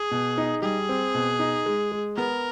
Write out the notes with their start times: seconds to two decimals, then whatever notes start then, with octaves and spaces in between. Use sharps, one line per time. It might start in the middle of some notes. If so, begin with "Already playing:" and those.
Already playing: G#4
0.11 B2
0.38 D#4
0.62 G3 G#4
0.89 C4
1.14 B2
1.39 D#4
1.66 G#3
1.92 G#3
2.17 B3 A#4